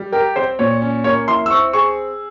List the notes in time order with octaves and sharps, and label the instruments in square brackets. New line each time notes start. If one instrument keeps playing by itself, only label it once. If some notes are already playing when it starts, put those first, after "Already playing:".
Already playing: [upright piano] G3
[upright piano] G4 [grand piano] A#4
[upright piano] C4 [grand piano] C5
[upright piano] A#2 [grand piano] C#5
[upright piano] C#4
[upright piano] A#3 [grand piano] C#5
[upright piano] E4 [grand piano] C6
[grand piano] E6
[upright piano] C4 [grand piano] C#6
[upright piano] G#4 [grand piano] C#6